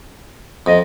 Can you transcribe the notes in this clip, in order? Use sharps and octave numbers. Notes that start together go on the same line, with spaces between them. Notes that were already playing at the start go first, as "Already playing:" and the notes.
F2 D#5